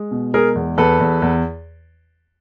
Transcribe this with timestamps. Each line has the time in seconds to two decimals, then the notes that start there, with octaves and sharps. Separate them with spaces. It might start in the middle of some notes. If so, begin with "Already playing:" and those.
Already playing: G#3
0.11 B2
0.34 G#3 G#4 A#4
0.55 E2
0.77 E2 A4 B4
1.00 E2
1.22 E2